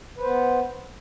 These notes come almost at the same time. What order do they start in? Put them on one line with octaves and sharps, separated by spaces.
B4 C5 B3